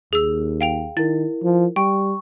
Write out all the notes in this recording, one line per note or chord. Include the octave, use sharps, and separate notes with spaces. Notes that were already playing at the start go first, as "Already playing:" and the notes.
D#2 G#4 E6
F5 G5 F7
D#3 E4 A#4 A6
F3
G3 G5 C#6